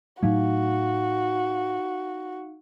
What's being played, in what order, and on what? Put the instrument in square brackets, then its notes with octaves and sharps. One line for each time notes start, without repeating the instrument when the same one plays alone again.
[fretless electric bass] A2 F#3 A3 [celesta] D#4 F5 [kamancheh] F#4